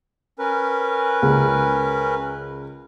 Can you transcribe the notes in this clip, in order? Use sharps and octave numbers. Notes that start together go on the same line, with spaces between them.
C#4 A#4 B4
C#2